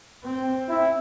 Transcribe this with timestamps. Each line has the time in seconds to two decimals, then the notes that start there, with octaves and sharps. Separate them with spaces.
0.24 C4
0.68 E4